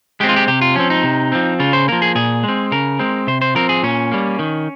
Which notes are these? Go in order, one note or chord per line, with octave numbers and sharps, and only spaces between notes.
G#3 C4 G4
F4
G4
C3 G4
F4
F3 C4 C#4
D#4
C3
F3 C4
C#3 F4
C5
F3 A#3 A#4
G#4
A#2 G#4
G#3
C4
C#3 A#4
G#3 C4
C3 C5
C5
F3 C4 A#4
G#4
A#2 C#4
G3 A#3
D#3